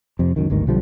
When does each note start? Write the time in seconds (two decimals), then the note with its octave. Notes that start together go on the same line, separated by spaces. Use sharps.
0.19 F2 C3
0.36 C#2 F#2 D#3
0.50 G#1 D2 G2 D#3
0.67 B1 D3 F3 G3